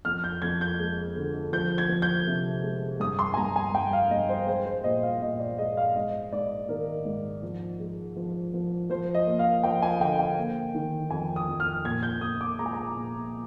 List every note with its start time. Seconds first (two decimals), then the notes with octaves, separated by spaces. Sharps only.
0.05 F2 F6
0.24 G6
0.42 F2 G#6
0.61 G6
0.79 G#3
1.17 D3
1.52 F3 G6
1.78 G#6
1.89 F3
2.02 G6
2.27 C3
2.63 G#3
3.00 G2 D#6
3.19 C6
3.34 G#5
3.37 G2 A#5
3.56 G#5
3.73 G2 G5
3.93 F5
4.11 G2 D#5
4.29 C5
4.47 G#3 C5
4.66 C5
4.84 A#2 D#5
5.03 F5
5.22 A#2 D#5
5.40 D5
5.58 G#3 D#5
5.77 F5
5.95 G#2 D#5
6.32 G#2 D5
6.69 D#3 A#4
7.05 G#2
7.42 F3
7.80 G#3
8.16 F3
8.54 F3
8.89 F3 C5
9.14 D#5
9.26 A#3
9.39 F5
9.64 F3 G5
9.82 G#5
10.00 D3 G5
10.19 G5
10.38 A#3
10.75 D#3
11.11 F2 G#5
11.36 D#6
11.48 F2
11.60 F6
11.85 A#2 G#6
12.03 G6
12.21 A#2 D#6
12.41 D6
12.59 G#3 A#5
12.66 G#5
12.73 A#5
12.96 A#2